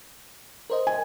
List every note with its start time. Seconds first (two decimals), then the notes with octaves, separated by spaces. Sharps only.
0.70 A#4 C5 D#5
0.87 G#5